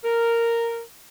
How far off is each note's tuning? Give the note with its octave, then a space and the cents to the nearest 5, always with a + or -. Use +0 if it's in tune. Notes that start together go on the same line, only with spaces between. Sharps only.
A#4 -5